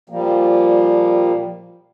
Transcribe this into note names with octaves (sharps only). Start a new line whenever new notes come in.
A#2 F3 G3 A#3